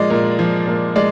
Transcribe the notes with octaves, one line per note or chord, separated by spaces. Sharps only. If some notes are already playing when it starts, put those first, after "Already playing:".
Already playing: A#2 F3 G#3 D5 D#5
A#2
F3
A#2
G#3 D5